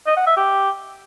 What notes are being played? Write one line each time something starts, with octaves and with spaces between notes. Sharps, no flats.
D#5
F#5
E5
G4